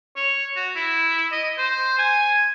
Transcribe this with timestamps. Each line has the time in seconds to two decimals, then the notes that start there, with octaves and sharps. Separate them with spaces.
0.16 C#5
0.56 F#4
0.76 E4
1.32 D#5
1.58 C5
1.98 G#5